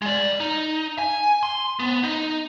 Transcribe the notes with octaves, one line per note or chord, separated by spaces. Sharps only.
G#3 D5
D#4
G#5
C6
B3
D#4